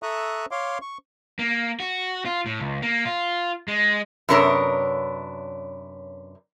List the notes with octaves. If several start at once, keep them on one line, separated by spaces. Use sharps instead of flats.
A4 E5 A#5 C#6 D#6 F#6
C#5 F5 C6 D6
C#6
A#3
F#4
F4
A2
C#2
A#3
F4
G#3
F#2 C3 B3 D4 A#4 C#5